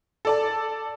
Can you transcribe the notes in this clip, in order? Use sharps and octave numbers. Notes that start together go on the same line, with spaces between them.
A4 D5 A5